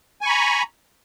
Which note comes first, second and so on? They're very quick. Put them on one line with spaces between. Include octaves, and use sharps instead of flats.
G#5 C#6 B5 A#5